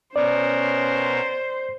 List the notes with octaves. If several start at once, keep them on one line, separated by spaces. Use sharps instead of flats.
B2 B3 C#4 A#4 C5 D5